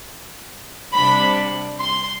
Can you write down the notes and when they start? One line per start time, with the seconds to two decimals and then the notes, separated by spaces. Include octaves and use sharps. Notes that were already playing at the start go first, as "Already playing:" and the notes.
0.93 C3 G3 D4 B5
1.80 C6